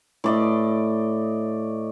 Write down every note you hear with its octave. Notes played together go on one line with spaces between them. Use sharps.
A2 D5 D#5